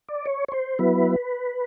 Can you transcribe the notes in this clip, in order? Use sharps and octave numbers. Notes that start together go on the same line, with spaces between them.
D5
C#5
C#5
C5
F#3 B3 E4 B4